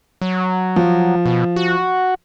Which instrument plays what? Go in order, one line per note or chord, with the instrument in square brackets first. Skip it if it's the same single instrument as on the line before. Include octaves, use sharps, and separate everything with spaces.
[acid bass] F#3
[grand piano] F3
[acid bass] B2
F#4